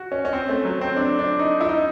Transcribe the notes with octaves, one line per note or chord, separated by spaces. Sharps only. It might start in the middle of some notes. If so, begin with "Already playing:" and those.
Already playing: F#4
C#4
C#4
C4
A3
F#3
C4
D4
D4
D#4
E4
D#4